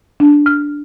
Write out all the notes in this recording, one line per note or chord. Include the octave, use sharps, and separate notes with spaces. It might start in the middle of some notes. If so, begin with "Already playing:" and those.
D4
F6